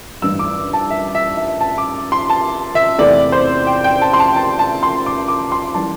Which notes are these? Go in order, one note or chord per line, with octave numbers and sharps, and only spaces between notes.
A1 G2 E3 E6
D6
A5
E5
E5
E5
A5
D6
C6
A5
E5
E2 C3 A3 C4 D5
C5
G5
G5
A5
C6
A5
A5
A5
C6
D6
D6
C6
E3 G3 A5